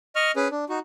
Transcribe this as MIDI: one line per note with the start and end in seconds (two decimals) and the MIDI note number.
0.15 0.32 75
0.15 0.32 85
0.15 0.32 89
0.36 0.48 61
0.36 0.48 68
0.36 0.48 71
0.51 0.65 62
0.69 0.79 63
0.69 0.79 66